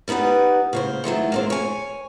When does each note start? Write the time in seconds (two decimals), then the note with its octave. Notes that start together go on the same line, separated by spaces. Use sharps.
0.08 G3 B3 D#4 B4 F#5
0.73 C#3 A#3 C5
1.04 D#3 E3 F#3 A3
1.32 A#3 D4 C5
1.50 C#5 G#5